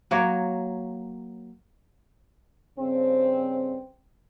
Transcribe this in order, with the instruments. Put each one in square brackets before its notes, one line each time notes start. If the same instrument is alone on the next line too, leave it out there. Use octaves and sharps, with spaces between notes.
[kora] F#3 A#3 C#5
[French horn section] G2 C#3 C4